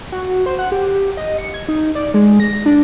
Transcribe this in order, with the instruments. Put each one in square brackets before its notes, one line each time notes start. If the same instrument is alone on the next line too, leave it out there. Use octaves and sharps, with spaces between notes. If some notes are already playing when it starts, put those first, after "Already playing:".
[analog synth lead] F#4
C5
F#5
G4
D#5
C#7
G#6
D#4
D5
G#3
A#6
D4